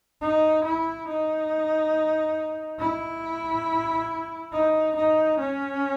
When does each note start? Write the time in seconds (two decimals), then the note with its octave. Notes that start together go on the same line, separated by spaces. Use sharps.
0.21 D#4
0.65 E4
1.08 D#4
2.79 E4
4.52 D#4
4.96 D#4
5.39 C#4